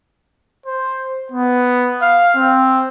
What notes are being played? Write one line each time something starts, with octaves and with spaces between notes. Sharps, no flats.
C5
B3
F5
C4